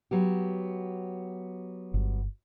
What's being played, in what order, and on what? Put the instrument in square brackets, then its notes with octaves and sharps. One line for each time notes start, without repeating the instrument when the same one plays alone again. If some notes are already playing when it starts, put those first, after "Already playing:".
[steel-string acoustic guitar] F#3 B3 G4
[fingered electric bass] G1